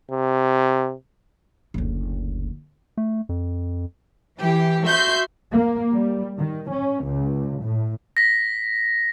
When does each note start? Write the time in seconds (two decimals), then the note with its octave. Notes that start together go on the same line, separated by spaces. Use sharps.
0.10 C3
1.74 F#1 D2
2.97 A3
3.29 F2
4.41 E3 G4
4.87 F#4 E5 C6 G6
5.51 A#3
5.93 G3
6.37 D#3
6.71 C#4
7.04 C#2
7.63 A2
8.17 A#6 B6